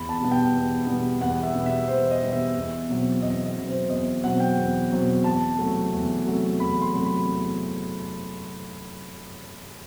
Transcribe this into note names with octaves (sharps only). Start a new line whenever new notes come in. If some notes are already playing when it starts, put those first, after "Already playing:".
Already playing: E2 B5
A5
B2 G3 B3
G5
E2
B2 G3 B3
E2 F#5
E5
B2 G3 B3
E5
E2 C5
D#5
B2 G3 B3
E5
E2
B2 F#3 C4
E2 D#5
D#5
B2 F#3 C4
C5
E2 D#5
B2 F#3 C4 F#5
G5
E2
B2 F#3 C4
E2 A5
C3 F#3 A3
E2
C3 F#3 A3
E2 B5
C6
C3 F#3 A3
B5
E2